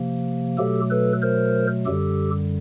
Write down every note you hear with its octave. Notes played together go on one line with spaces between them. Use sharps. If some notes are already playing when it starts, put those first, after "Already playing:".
Already playing: C3 F3 A#3
B2 F#3 A3 G4 A4
A4 B4
A#4 C5
F#2 D3 G3 G4 A4